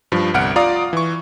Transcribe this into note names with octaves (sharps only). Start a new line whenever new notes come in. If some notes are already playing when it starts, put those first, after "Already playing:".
G2 F3
G1 C2 F#5 F6 D7
F4 D5 F5 A#5 D6 D#6
E3 C#6